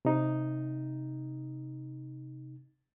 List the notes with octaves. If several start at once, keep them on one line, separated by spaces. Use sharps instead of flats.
C3 D#4